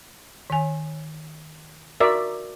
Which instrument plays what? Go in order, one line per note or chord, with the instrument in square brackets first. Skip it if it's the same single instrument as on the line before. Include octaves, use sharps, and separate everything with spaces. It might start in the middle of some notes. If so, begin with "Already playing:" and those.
[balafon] D#3 C#5 G#5
[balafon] F#4 C#6 [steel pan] A#4 D5 E5